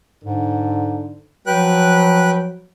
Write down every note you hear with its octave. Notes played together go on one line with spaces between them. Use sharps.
G#2 D3
F3 F#3 B4 G5 F#6